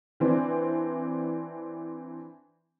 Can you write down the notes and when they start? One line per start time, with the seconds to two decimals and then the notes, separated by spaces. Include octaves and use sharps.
0.20 E3 C4 D4